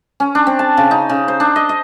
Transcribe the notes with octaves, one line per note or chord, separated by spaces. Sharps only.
C#4
D4
C4
A5
C#3
D#4
C#3
C5
D4
D#5
D#5